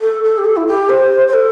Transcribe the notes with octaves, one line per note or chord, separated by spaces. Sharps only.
A4
A4
G4
A4
E4
G4
C5
C5
A4